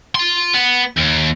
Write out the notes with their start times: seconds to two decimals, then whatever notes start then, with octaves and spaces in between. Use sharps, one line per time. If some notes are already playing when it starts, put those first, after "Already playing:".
0.15 F4 C6
0.54 B3
0.97 D#2